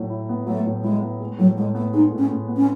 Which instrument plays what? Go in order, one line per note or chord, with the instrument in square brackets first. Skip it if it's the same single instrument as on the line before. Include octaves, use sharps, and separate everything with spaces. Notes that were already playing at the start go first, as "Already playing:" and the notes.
Already playing: [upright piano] A2 F#3
E4
B3
[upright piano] F#3 [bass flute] A3
[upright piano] A2
[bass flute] G#3 [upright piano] E4
[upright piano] B3
G#3
[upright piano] A2 [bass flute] F#3
[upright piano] A2 [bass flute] G#3
[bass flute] A3 [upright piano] B3
[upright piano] G#3 [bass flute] D#4
[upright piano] A2
[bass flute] C#4
[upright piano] A2
B3
[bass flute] C#4